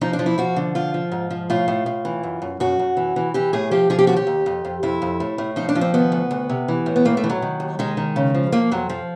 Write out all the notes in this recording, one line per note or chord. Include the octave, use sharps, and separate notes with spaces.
F3 D#4
D4
F3
E4
F3 F#4
D3
F3 F4
F3
G#2
F3
A2 F4
A2
A2
E3
F#2
F#2
F#2 F#4
F#2
E3
E3
E3 G4
A2 G#4
F3 G4
F3 G#4
G4
D#2 F#4
G4
D#2
F2
F2
F2 E4
F2
A2
A2
F3 D#4
D4
F3
C4
D#3 B3
D2
D2
C3
E3
A2
B3
A2 A#3
A3
E3
F#3
D#3
D#2
D#3 G#3
D#3
C#3
F3
F3 A#3
F2 F#3
F3